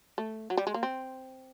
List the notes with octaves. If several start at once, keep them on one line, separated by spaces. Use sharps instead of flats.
A3
F#3
G3
G#3
A#3
C4